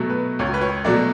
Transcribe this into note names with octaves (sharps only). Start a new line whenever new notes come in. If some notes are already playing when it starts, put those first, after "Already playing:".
Already playing: B2 F#3 A3
B4
C#2 C#5
B4
C#5
B2 F#3 A3 D5